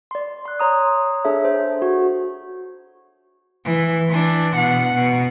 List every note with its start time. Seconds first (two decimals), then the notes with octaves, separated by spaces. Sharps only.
0.11 D5 C6
0.45 C6 F#6
0.59 C#5 A#5 D#6
1.25 D4 G#4 A4 C#5 E5
1.45 C5
1.82 F#4
3.65 E3
4.10 E3 D4
4.57 B2 F#5
4.94 B2